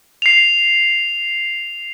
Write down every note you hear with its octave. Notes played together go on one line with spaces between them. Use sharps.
C7 F7